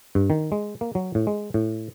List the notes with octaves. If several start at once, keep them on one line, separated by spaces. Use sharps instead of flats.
G2
D#3
G#3
A#3
F#3
A2
G#3
A2